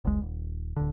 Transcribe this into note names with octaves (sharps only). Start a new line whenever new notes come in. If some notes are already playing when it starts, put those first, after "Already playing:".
F#1 C#2 G#3
D#1
D1 D3